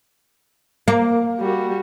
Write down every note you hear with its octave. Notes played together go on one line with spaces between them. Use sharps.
A#3
G3 F#4